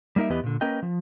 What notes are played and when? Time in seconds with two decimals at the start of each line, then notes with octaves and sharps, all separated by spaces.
0.16 G3 A#3 D#4 A#4 E5
0.30 E2 E3 B3 G4 B4 D#5
0.43 A#2 D3
0.61 A#3 C#4 A#4 B4 D#5 G5
0.83 F3